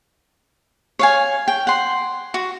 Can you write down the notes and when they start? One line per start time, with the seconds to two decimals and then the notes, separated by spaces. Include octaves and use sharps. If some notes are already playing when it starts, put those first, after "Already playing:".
0.99 C#5 F5 G#5
1.48 G5
1.67 F#5 C6
2.34 F#4